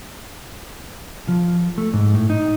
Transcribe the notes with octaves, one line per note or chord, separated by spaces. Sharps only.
F3
A3
G#2
A2
D#4